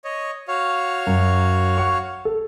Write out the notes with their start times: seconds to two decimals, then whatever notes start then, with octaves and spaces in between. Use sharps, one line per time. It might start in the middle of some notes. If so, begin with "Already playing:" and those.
0.04 C#5 D#5
0.48 F#4 C#5 F5
1.07 F#2
1.78 F#5 C#6
2.25 A4